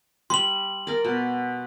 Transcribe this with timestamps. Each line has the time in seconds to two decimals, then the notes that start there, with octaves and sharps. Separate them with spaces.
0.30 G3 C6 F#7
0.87 A#4 D5
1.04 B2